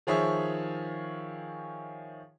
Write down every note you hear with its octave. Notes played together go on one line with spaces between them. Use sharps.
D#3 F3 G#4 C#5 E5 C#6